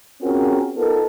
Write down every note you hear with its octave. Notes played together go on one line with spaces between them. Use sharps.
C4 C#4 F4 F#4 G#4 A#4
B3 D#4 F4 A4 A#4